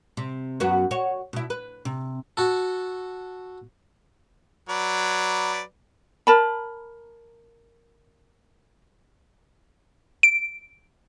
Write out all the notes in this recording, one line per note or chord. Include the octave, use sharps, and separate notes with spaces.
C3
F#2 B3 F#4
F#4 C#5
B2 E4
B4
C3
F#4 A4
F#3 B4 D5
A#4 A5 B5
D7